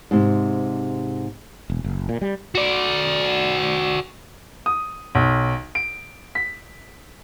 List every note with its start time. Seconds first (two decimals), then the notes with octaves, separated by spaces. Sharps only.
0.11 G#2 C3
1.70 E1
1.84 F#1
2.09 A#2
2.21 G3
2.55 F#4 D5
4.66 D#6
5.15 B1
5.75 D7
6.35 B6